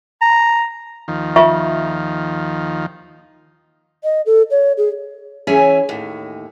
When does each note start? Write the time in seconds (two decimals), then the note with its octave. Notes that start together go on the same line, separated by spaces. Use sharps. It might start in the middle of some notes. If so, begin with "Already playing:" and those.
0.21 A#5
1.08 D#2 D#3 F3
1.36 F4 E5 C#6
4.04 D#5
4.26 A4
4.51 C#5
4.78 G#4
5.47 E3 C#4 G#4 C#5 E5 G#5
5.89 D#2 A2